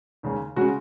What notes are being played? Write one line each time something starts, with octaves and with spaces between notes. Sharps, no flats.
D#2 C#3 G#3 C#4
C#3 G#3 C#4 F#4